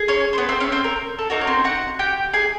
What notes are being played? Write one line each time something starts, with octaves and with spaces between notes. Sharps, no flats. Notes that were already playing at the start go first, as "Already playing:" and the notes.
Already playing: G#4
C#4 C#5
C5
B3 B4
C4 C5
C#4 C#5
C4 C5
A#4
A4
A#3 D#4 F#4 A#4
C#5
C4 C5
F#4 F#5
G4 G5
G#4 G#5